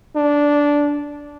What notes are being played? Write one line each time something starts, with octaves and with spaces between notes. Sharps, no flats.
D4